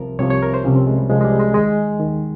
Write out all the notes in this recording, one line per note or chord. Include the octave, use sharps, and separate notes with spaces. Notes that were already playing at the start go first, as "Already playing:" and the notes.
Already playing: C2 C3 F3 A#4
C2 C3 F3 C#5
C#5
A#4
C5
C2 C3 F3 C#4
C4
G#3
G3
C2 C3 F3 G#3
G#3
G3
G#3
D#2 D#3 G#3
D#2 D#3